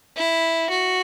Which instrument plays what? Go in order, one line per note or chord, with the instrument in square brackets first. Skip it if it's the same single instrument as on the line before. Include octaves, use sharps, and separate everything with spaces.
[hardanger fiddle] E4
F#4